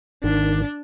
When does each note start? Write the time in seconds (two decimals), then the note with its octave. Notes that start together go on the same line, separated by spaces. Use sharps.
0.24 G#1 D#3 D4